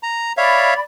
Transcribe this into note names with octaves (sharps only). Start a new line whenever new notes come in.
A#5
C#5 D5 E5 F5 B5